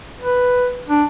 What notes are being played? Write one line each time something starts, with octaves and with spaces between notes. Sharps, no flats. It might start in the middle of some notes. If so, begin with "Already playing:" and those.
B4
D4